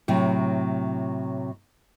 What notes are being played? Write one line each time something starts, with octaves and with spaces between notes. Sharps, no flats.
A2 C3 F#3